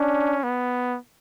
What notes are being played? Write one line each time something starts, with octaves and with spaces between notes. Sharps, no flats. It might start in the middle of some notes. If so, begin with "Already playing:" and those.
Already playing: C#4 D4
B3